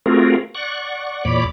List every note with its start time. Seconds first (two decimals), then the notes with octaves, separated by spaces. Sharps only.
0.06 A3 C4 F4 F#4 G#4 A#4
0.55 D5 F#5 C#6
1.25 E2 A#2 C#5 D5 B5 D6